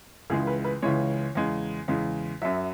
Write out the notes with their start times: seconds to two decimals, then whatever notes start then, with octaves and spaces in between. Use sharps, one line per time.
0.30 C#2 C#3 E3 G#3 G#4
0.47 B4
0.64 B4
0.82 C#2 C#3 E3 G#3 C#5
1.35 E2 C#3 G#3
1.88 E2 C#3 G#3
2.42 F#2 F#3 E5